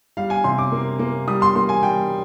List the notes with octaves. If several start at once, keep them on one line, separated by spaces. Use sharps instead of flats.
G3 F5
G#5
C3 C6
D6
A#3
A#3
G3 D#6
C6
A#3 C6
G#5
G3 G5